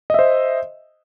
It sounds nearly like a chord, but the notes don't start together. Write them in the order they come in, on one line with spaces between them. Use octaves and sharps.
D#5 E5 C5